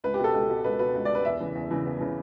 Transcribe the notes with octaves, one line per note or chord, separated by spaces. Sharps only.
C#2 B4
G4
B2 A4
C#2
B2
C#2 B4
B2 B4
C#2
B2 D5
B4
E2 E5
C#3 E3
E2
C#3 E3
E2
C#3 E3